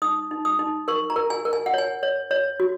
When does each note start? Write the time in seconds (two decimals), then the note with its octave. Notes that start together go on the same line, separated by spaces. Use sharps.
0.02 D#4 D#6
0.31 D#4
0.45 D#6
0.59 D#4
0.88 A#4 C#6
1.10 A#5
1.16 A#4
1.30 G#5
1.45 A#4
1.53 G#5
1.66 F#5
1.74 C#5 G#5
2.03 C#5
2.31 C#5
2.60 F#4